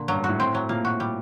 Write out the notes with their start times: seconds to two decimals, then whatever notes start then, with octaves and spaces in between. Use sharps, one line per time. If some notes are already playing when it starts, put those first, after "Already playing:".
Already playing: A#2 D3
0.08 G2 F#3
0.18 G2
0.24 F#4
0.29 A2
0.40 C4
0.55 F#3
0.69 A#2 A#3
0.85 F#4
1.00 G3